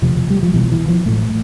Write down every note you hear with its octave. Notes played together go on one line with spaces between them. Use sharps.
E1 D2 C3 F3
G3
F3
B1 B2 E3
E3
F3
A1 A2 A3